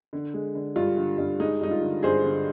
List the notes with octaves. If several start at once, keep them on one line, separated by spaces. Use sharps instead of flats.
D3
G#3
D3
G2 F4
D3
G2
G#3 D#4
G2 D#4
F4
D3
G2 G#4 C5
D3